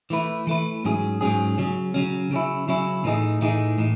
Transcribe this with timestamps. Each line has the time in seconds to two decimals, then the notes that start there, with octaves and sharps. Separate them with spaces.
0.10 E3 A3 E4 B4
0.47 E3 A3 E4 B4
0.85 G#2 F#3 C#4 G#4
1.21 G#2 F#3 C#4 G#4
1.58 C#3 F#3 C#4
1.94 C#3 F#3 C#4
2.31 C#3 F#3 C#4 E4
2.68 C#3 F#3 C#4 E4
3.04 A2 E3 A3 D#4 G#4
3.41 A2 E3 A3 D#4 G#4
3.78 A2 E3